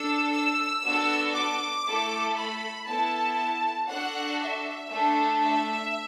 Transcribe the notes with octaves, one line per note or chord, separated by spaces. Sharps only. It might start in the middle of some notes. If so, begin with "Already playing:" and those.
Already playing: D4 A4 E6
E6
B3 D4 F#4 A4
D6
A3 E4 A4
B5
B3 E4 A4 A5
D4 F#4 A4 F#5
E5
A3 D4 A4
E5